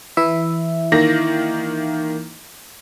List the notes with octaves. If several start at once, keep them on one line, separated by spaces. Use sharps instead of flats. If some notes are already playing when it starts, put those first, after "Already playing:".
E3 E4 E5
D#3 A#3 A#6